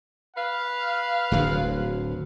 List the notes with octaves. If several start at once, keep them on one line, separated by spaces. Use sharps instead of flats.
B4 F5
D1 D2 F#3